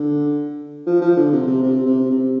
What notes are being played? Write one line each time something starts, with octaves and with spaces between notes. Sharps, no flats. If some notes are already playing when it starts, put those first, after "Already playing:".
Already playing: D3
F3
F3
D3
C3
C3
C3
C3
C3